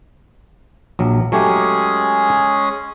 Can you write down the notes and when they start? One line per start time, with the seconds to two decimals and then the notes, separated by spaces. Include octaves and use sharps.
0.99 A#1 F#3
1.32 F#3 G#3 A3 C#4 G4 G#4